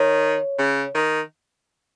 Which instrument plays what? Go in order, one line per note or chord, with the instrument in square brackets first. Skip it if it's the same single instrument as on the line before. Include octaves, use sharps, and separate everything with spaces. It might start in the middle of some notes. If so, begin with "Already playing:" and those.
Already playing: [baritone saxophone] D#3 [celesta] C#5
[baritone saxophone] C#3
D#3